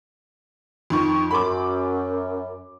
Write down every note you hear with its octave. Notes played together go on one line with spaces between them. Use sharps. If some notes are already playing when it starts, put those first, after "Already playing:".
F2 D#3 C#6
F#2 B5 D6